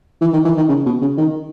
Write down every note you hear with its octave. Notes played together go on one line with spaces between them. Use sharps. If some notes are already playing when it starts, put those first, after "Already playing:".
E3
D#3
E3
D#3
C#3
B2
C#3
D#3